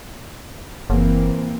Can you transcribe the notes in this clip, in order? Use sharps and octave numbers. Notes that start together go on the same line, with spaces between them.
F#1 E3 A#3 C4